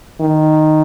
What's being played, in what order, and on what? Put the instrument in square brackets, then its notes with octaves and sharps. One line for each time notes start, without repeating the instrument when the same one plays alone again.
[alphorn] D#3